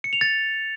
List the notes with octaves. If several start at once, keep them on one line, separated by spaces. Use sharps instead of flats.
C#7
F7
A6